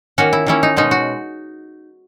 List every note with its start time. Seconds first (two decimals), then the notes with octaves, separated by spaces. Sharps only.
0.18 D#3 A#3 C#4 F#4
0.33 E4
0.46 D#3 A#3 C#4 E4
0.63 D#4
0.76 B2 G#3 C#4 D#4
0.91 F#4